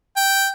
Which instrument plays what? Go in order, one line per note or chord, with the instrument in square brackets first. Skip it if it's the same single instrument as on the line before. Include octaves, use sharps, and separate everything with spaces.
[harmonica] G5